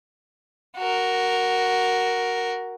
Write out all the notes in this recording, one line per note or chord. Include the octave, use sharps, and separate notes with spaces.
F#4 A#4